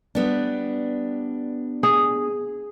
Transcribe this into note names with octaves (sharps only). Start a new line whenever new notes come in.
G3 B3 D4
G#4